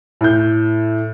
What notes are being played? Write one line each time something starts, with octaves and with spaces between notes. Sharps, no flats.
A2 G6